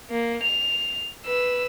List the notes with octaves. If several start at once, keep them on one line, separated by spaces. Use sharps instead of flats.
A#3
F7
B4 E6